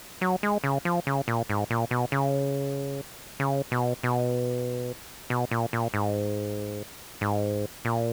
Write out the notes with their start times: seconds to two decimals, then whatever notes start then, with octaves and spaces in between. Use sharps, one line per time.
0.21 F#3
0.43 G#3
0.64 C#3
0.85 F3
1.07 C#3
1.28 A#2
1.50 G#2
1.70 A#2
1.91 B2
2.12 C#3
3.40 C#3
3.72 B2
4.03 B2
5.30 B2
5.51 A#2
5.73 A#2
5.94 G#2
7.21 G#2
7.85 A#2